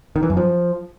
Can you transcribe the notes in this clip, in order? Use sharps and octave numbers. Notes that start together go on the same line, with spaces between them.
D#3
E3
F#2
F3